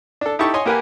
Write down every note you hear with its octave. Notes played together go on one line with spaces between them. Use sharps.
D4 A4
D#4 E4 G4 A4 A5 C#6
C#5 D#5 G#5 C6 C#6
A#3 G4 A#4 B4 F#5 G#5